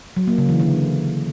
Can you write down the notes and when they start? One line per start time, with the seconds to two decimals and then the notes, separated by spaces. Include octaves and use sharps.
0.17 F#3
0.27 A#3
0.38 C#3
0.49 E3
0.60 D3